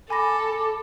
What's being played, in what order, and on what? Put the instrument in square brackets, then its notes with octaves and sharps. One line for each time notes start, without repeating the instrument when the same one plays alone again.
[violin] A4 [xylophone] G#5 B5 A#6 [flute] D6